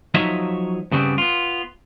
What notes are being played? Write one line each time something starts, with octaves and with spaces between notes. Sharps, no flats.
F3 F#3 D#4 C#5 D#5 E5
G2 C#3 G3 B3 C4
B3 F4